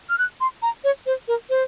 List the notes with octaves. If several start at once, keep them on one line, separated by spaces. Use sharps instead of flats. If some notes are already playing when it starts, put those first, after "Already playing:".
F6
F#6
C6
A#5
C#5
C5
A#4
C5